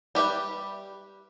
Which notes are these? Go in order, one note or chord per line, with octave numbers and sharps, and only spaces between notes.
G3 G4 B4 E5